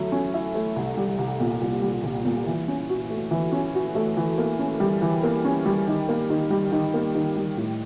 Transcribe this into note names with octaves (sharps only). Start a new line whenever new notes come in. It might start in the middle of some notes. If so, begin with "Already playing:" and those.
Already playing: F#3 A3 E4
C#4
E4
A3
C2
G3
C2
A#2
C2
G3
C2
A#2
E3
C#4
F#4
A3
E3
C#4
F#4
A3
E3
A#3
C#4
G3
E3
A#3
C#4
G3
D#3
A#3
D#3
G3
D#3
A#3
D#3
G3
A2